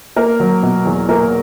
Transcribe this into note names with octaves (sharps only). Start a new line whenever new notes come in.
A#3 A#4
F#3
B2
E2
A#3 A#4